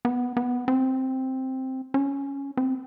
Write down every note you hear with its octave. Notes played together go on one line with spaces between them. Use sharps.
B3
B3
C4
C#4
C4